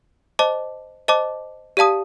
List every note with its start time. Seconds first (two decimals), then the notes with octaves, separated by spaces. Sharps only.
0.39 C5 D#5 A5 D6
1.08 C5 D#5 A5 D6
1.77 G4 D5 F5 A5 D#6